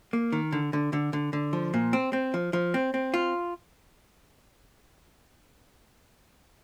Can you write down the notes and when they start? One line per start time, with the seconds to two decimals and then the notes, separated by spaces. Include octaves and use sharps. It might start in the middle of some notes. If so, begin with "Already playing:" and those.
0.13 A#3
0.32 D#3
0.52 D3
0.73 D3
0.93 D3
1.13 D3
1.33 D3
1.53 F3
1.74 A#2
1.93 C4
2.13 C4
2.34 F3
2.53 F3
2.74 C4
2.94 C4
3.14 F4